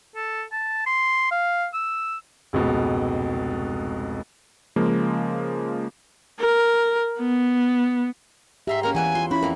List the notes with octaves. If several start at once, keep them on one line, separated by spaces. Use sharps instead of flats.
A4
A5
C6
F5
E6
F1 C#2 G#2 B2
C#3 F3 G#3 A#3
A#4
B3
G#2 G4 E5 A#5 C6
A#3 C#4 A#4
E2 E3 E4 B4 F#5 G#5
F4 C6
C#4 E4 F#4 B5
F2 A#3 A#4